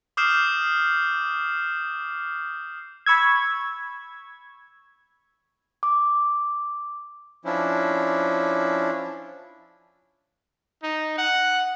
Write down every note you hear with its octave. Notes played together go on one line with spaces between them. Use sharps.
D6 D#6 F6 G6 C7 E7
B5 C#6 E6 G#6
D6
F3 C#4 D4 E4
D#4
F#5